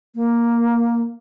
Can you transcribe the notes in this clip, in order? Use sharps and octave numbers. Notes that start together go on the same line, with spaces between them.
A#3